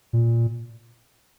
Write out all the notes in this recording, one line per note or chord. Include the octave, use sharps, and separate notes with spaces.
A#2